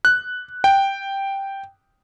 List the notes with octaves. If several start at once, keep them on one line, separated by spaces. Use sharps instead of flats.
F#6
G5